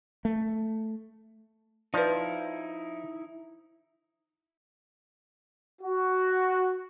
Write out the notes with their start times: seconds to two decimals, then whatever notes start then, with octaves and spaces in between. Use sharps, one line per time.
0.25 A3
1.94 F3 D#4 E4 B4 D5
5.81 F#4